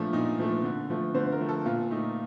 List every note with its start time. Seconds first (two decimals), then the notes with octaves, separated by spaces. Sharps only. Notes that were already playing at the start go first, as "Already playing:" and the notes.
Already playing: A#2 F3 A3 D4
0.13 A#2 D#4
0.39 F3 A3
0.64 D3
0.90 F3 A3
1.14 D3 C5
1.32 A#4
1.41 F3 A3
1.49 A4
1.66 A#2 F4
1.91 A3 D#4